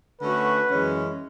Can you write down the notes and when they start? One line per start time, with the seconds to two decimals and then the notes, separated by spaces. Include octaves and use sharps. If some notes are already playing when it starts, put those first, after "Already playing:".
0.21 D3 A3 C#4 F#4 B4
0.69 F#2 E3 G#3 C#4